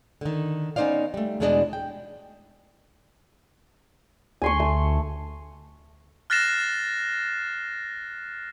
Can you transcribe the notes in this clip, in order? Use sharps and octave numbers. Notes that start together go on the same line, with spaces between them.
D3 D#3
B3 C#4 D#4 C5 D5 F5
G3 A3
E2 B2 G#3 D4 D5 D#5
G5
D2 G#5 C6 C#6
A3
F6 F#6 A6 A#6 C7 E7